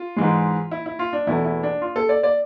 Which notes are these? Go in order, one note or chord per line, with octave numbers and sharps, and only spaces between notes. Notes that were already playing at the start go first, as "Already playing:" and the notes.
Already playing: F4
G#2 E3 G#3
E4
E4
F4
D4
E2 B2 A3 E4
E4
D4
F4
A4
D5
D5